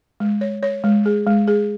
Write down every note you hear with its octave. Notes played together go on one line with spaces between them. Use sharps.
G#3
C#5
C#5
G#3
G#4
G#3
G#4